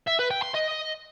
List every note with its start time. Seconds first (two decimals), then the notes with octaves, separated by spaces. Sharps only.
0.07 E5
0.19 B4
0.31 G5
0.43 C6
0.55 D#5